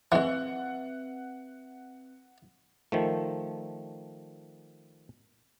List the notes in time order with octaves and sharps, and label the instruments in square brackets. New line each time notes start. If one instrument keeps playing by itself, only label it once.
[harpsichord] E3 G#3 [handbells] C4 B4 E5 [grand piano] F#5
[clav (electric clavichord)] D#3 F3 A3